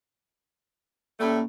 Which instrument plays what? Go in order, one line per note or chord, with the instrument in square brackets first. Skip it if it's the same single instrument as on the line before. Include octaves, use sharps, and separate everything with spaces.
[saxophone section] A2 G3 A3 [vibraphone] A#3 C#4